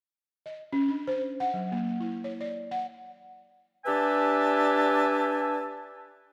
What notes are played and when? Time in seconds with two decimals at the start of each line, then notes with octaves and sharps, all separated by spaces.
0.46 D#5
0.72 C#4
0.88 D4
1.07 C5
1.40 F#5
1.54 F#3
1.72 A#3
2.00 E4
2.24 C#5
2.41 D5
2.71 F#5
3.85 D4 G4 B4 E5 G#5 A5